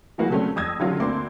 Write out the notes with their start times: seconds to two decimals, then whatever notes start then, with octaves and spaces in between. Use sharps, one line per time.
0.18 E3 F#3 A#3 B3 F#4 G#4
0.30 C#3 F#3 G3 A3 C4 C#4
0.56 F2 D#6 E6 G#6 A#6
0.80 D3 D#3 F#3 C#4 F4 G4
1.00 D2 A#3 C4 D4 C6 D6